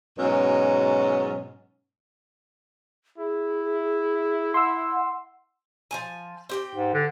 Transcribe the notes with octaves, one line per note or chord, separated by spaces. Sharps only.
G#2 B2 F#3 C#4
E4 G#4
F#5 C6 E6
F3 C4 G#5
C4 G4 G5
G#2
D3